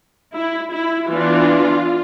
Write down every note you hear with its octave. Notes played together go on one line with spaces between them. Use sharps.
E4
E4
E3 B3 D4 F4